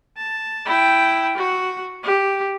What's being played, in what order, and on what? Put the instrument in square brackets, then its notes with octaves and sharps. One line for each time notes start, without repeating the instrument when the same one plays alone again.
[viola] A5
E4 G5
F#4
G4